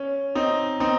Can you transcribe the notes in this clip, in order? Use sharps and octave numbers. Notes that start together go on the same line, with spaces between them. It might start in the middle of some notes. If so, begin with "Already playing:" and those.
Already playing: C#4
C4 D#4
C4 D#4